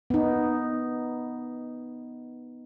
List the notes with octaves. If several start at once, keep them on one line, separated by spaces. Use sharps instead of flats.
B3 D#4